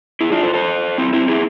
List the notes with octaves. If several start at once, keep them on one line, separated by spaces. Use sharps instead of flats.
E4 G#4
D4 F4
A4 C5
A4 C5
C4 E4
C4 E4
E4 G#4